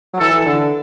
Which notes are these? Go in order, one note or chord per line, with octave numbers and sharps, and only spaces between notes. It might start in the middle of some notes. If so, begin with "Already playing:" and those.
F#3
E3 A4
D3